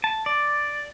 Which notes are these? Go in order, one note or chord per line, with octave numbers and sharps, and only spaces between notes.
A5
D5